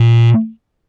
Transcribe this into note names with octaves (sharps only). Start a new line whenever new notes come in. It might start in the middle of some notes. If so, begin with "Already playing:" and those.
Already playing: A#2